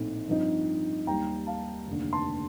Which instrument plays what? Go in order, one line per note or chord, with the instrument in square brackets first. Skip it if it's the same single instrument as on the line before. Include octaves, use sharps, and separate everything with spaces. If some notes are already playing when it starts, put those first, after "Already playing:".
Already playing: [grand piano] A#1 A2 A3 C4 D#4
G2 F3 C4 D#4
D#2 D#3 G3 G5 A#5
F5 A5
F1 D#2 D3
A5 C6